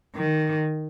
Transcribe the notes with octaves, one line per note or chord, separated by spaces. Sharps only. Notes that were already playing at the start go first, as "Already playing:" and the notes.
D#3